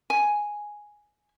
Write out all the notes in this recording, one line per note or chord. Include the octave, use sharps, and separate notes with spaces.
G#5